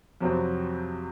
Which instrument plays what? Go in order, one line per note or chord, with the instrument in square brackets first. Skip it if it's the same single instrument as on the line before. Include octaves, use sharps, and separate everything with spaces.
[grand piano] F2 C3 F#3 C4